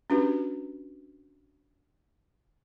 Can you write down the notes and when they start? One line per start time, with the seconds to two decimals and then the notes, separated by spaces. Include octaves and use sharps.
0.10 C#4 D4 F#4 G4 B4